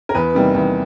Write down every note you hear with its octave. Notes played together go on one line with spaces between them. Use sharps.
A#4
E2 B4
C3 D#3 G3 A#3
E2